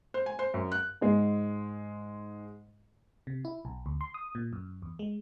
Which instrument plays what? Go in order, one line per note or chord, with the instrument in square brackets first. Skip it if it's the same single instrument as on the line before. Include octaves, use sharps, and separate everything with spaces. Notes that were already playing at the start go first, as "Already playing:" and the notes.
[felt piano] C5
G#5
C5
F#2
F#6
[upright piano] G#2 G#3
[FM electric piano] C3
E4
B1
D2
C6
D#6
A#2
F#2
E2
G#3